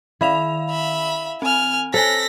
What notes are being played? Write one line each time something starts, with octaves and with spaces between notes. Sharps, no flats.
D#3 E4 F5 F7
E5 B5
C4 G#5 F6
A4 C5 C#5 G#5 A#6 B6